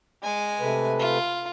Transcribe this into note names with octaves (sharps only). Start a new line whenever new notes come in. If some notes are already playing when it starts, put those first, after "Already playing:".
G#3 G#5
C3 A3 B4
F4